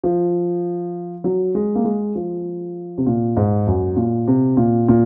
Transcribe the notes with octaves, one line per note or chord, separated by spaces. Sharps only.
F3
F#3
G#3
A#3
G#3
F3
C3
A#2
G#2
F#2
A#2
C3
A#2
A#2